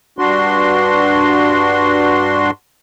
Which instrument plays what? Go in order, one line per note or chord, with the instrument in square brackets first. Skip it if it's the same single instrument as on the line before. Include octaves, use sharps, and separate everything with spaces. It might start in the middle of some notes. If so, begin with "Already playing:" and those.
[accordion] G2 D4 F#4 C6